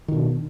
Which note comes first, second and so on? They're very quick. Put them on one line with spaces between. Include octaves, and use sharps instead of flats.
D#3 B2 D4